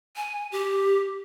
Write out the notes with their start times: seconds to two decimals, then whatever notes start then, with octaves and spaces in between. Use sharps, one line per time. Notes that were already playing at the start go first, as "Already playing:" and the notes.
0.16 G#5
0.52 G4